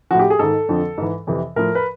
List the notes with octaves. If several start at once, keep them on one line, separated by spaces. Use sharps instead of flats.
A2 F3 F#4
G4
G#4
G#2 D#3 A4
F2 D3 F3
G#2 E3
F2 C3 E3
A2 F3 A#4
B4